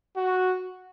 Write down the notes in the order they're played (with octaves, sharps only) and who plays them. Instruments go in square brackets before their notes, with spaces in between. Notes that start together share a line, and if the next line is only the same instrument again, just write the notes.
[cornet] F#4